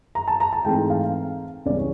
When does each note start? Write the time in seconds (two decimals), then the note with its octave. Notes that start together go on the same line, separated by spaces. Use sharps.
0.15 A#5
0.28 A5
0.40 A#5
0.53 A5
0.65 G#2 E3 A3 C4 G5
0.90 F5
1.66 C#2 C#3 E3 G3 D5
1.78 C#5